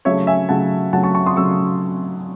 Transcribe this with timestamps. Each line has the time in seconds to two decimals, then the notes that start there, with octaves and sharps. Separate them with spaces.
0.05 C#3 F#3 A3 C#5 E5
0.27 E5 G#5
0.49 C#3 F#3 A3 F#5 A5
0.93 C#3 F#3 A3 F#5 A5
1.03 A5 C#6
1.15 A5 C#6
1.26 C6 D#6
1.36 C#3 F#3 A3 C#6 E6